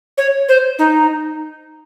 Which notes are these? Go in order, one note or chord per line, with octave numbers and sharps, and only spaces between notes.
C#5
C5
D#4